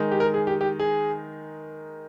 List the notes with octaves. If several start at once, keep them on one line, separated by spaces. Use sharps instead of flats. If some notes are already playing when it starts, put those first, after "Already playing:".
Already playing: D#3 G#3 D#4
G4
A#4
G#4
G4
G4
G#4